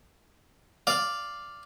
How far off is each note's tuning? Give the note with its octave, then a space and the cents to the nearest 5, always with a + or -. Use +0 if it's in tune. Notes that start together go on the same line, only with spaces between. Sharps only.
D5 +0 F5 +0